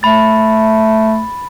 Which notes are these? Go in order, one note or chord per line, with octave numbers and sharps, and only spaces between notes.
A3 B5 A6